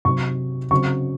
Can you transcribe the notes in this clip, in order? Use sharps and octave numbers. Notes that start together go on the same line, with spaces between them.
C3 F#3 C4 C#6
C#3 F#3 C4 C#6